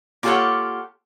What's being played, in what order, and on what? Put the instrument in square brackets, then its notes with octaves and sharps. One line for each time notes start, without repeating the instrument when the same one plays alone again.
[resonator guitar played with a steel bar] A#3 F4 G4 A4 C#5 F#5